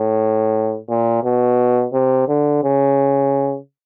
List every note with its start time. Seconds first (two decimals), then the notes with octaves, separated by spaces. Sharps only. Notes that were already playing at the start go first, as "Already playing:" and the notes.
Already playing: A2
0.89 A#2
1.24 B2
1.93 C3
2.28 D3
2.63 C#3